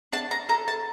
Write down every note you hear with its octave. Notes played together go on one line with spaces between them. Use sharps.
D4 A5
A#5
A4 A#5
A5